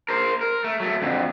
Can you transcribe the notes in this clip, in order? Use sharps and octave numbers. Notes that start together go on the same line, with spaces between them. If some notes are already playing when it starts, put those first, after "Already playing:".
A#4 C5
A#4
A3
F#3 A3
F2 D3